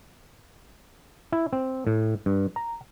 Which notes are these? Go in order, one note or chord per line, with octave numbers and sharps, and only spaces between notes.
E4
C4
A2
G2
A#5